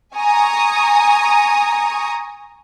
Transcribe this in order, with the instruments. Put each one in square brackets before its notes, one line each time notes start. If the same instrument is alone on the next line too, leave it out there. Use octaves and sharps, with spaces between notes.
[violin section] G#5 A#5 C#6 D#6